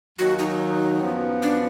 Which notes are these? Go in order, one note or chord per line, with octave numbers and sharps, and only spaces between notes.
D#2 D#3 F#3 F#4
D#4
F#2 F3 B3
D4